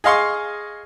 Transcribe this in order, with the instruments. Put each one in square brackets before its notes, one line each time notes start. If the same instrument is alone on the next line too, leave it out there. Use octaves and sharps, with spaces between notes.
[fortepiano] G#4 D#5 F5 C6 C#6